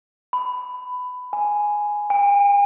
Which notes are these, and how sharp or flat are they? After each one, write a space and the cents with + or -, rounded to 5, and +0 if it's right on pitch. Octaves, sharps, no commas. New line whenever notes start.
B5 +15
G#5 +0
G#5 -45